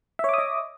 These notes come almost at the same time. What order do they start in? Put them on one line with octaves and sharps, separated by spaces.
E5 C#5 D6 D#6 D#5